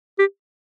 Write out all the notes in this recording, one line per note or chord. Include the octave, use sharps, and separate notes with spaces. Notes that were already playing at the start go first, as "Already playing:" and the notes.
G4